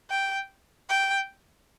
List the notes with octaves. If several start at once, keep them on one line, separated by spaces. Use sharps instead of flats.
G5
G5